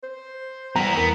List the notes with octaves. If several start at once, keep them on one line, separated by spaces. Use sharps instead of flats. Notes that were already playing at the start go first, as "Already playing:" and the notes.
C5
E3 G3 B3 A#5
E2 B3 A#4